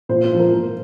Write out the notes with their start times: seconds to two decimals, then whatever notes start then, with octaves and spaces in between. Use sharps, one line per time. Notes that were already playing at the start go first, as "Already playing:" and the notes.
0.09 A#2 C5
0.24 C5
0.32 F3
0.39 A#4
0.54 A#2